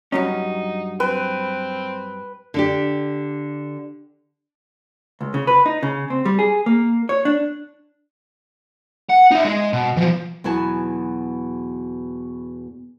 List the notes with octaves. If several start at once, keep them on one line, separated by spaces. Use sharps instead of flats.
G2 F#3 C#4 D#4
C4 B4
D3 D4 G4
C#2
C#3
B4
D#4
C#3
C4
G3
G#4
A#3
C#5
D4
F#5
D#4 E5
G#3
B2
E3 F3
E2 B2 F#3 B4 G#5 A5